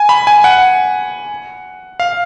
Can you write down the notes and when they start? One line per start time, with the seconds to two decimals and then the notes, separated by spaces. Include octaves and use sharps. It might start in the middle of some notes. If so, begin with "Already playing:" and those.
Already playing: G#5
0.09 B5
0.27 G#5
0.44 F#5
2.00 F5